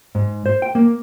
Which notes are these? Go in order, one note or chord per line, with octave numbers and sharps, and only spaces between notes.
G#2
C5
G5
A#3